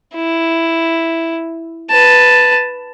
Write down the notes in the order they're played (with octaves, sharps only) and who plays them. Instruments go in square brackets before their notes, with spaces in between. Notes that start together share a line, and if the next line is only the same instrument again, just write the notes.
[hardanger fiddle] E4
B4 A5